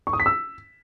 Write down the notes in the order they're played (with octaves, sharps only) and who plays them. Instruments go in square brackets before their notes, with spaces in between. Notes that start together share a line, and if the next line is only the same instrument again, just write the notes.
[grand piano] C#6
D#6
B6
E6